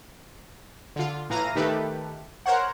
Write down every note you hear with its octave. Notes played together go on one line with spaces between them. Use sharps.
D3 F4
A2 E3 F5 A#5 A#6 D#7
D#3 A3 G4 A4 B4
A#4 C5 C#5 F#5